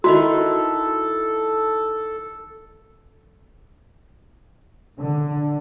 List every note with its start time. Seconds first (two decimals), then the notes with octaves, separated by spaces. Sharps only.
0.04 D#3 E4 F#4 A4 B4
5.00 D3